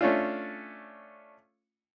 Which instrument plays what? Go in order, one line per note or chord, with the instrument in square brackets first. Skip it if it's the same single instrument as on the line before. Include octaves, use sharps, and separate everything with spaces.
[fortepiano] A3 C#4 D4 F4